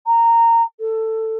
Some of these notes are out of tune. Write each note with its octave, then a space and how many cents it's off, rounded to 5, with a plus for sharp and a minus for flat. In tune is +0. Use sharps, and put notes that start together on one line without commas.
A#5 -15
A4 +15